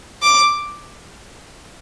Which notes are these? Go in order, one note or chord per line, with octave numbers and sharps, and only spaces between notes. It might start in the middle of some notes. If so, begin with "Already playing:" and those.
D6